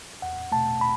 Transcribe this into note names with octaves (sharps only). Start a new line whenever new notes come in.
E2 F#5
B2 A3 A5
B5